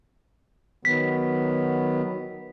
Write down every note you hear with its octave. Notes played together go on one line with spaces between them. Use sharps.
D#3 F#3 B3 B6